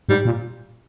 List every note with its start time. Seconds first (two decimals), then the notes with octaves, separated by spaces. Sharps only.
0.09 G#2 G3
0.25 A#2